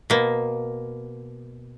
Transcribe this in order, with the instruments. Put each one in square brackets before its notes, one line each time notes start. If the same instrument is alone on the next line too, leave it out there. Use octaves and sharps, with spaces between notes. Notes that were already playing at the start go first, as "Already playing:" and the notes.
[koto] B2 A#3